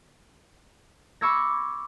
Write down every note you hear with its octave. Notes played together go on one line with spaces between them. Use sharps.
B5 C#6 D6 E6 G#6 A#6